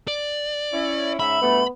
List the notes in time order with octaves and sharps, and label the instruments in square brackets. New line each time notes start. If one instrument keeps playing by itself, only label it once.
[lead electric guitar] D5
[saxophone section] C#4 E4
[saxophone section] G#2 C#4 E5 [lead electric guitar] B5
[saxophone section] G2 B2 A3 [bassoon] B3